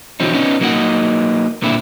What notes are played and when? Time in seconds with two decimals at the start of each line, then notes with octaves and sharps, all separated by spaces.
0.20 B1 D3 E3 F#3 C4 D#4
0.34 B3 C#4 D#4
0.61 F#3 A#3 D#4 F4 D#5 F#5
1.62 C#2 A#2 D3 C4 E4